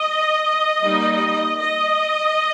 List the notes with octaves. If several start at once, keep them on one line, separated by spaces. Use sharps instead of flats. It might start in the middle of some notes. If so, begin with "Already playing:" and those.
Already playing: D#5
G3 A#3 D#4
D#5